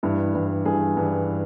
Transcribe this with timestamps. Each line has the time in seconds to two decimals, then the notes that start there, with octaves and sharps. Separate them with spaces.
0.03 G2 E3 E4
0.34 G2 E3
0.65 G2 E3 G#4
0.97 G2 E3